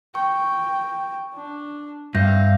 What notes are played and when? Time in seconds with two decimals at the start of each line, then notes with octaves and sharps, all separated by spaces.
0.15 G5 C#6
1.34 D4
2.15 G2 C4 E5 F5 G6 A#6